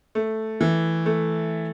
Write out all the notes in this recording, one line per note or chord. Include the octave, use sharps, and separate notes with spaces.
A3
E3
A3